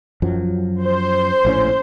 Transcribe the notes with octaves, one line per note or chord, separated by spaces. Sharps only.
F#2 F3 F#3
C5
A#1 A2 C#4